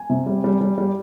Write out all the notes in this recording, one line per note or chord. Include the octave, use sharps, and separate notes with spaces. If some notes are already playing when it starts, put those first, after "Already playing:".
Already playing: G#5
C3
G3
G3
G3
G3